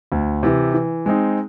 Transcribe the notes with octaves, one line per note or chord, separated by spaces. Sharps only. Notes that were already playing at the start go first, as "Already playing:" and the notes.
D2
C3 E3
E3
G#3 C4 D#4